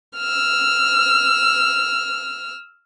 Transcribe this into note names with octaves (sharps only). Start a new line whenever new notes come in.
E6 F6